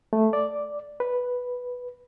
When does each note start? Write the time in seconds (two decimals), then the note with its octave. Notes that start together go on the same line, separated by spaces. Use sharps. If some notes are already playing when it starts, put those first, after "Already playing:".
0.13 A3
0.33 D5
1.00 B4